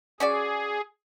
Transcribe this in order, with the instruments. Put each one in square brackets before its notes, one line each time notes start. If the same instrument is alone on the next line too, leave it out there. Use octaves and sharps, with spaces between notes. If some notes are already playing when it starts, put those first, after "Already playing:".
[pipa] C#4 F#4 D5 [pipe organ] G#4